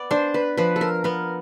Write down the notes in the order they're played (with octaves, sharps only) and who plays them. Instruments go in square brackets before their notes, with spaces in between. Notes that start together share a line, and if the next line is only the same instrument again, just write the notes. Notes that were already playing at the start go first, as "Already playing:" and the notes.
Already playing: [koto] B3 [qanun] D5
[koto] D4 [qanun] C5
[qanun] B4
[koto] F3 [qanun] B4
[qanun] A4
A#4
[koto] B3 [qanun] A#4